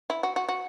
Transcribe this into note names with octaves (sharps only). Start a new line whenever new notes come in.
E4
F#4
F#4
F#4